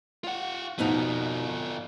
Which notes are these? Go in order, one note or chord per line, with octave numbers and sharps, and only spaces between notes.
F4 F#5
F2 B2 B3 D#4 F4